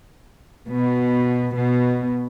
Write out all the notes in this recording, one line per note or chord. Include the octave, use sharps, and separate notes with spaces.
B2
B2